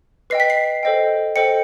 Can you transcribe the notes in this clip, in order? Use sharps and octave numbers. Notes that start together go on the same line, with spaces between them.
B4 D#5 G5 C7
B6
C7
A4 C5 D#5 G5
A4 C5 D#5 G5 C#7